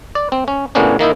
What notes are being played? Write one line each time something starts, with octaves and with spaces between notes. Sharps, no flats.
D5
C4
C#4
A2 C#3 A#3 B3 C#4 D4
D#3 A#3 D#4 E4